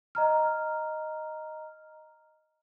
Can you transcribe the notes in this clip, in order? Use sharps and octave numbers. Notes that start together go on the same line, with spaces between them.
D#5 A#5 F6